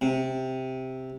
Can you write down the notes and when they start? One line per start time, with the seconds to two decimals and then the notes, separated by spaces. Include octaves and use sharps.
0.01 C3